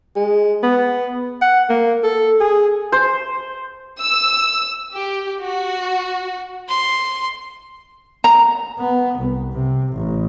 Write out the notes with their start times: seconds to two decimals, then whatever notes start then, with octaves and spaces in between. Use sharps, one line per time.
0.16 G#3
0.63 B3
1.41 F#5
1.69 A#3
2.03 A4
2.40 G#4
2.92 C5
3.99 E6
4.94 G4
5.40 F#4
6.69 C6
8.24 A#5
8.79 B3
9.20 C2
9.53 C3
9.93 A1